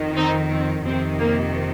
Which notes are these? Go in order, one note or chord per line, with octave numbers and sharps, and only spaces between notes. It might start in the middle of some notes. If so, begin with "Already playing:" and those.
Already playing: F2 D#3
C4 D#4
C4
F2 C3 D#3 C4
A#3